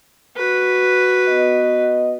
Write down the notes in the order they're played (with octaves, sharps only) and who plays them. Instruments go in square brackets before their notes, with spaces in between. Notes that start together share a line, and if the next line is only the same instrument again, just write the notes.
[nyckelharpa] F#4 B4
[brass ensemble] B3 D#5